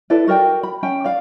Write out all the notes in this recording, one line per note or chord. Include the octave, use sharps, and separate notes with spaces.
E4 A4 B4 D5
F#4 A#4 D5 G5
B5
C#4 G5 G#5
D5 F5